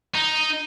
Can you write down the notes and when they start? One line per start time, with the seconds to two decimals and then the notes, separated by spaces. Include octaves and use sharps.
0.15 D#4